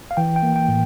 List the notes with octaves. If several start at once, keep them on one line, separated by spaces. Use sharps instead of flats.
F5
E3 G5
G5
A#3
G5
A2